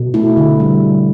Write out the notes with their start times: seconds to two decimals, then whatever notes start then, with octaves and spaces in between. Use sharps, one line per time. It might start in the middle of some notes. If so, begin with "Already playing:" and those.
Already playing: B2
0.14 A3 E4
0.37 D3
0.60 G3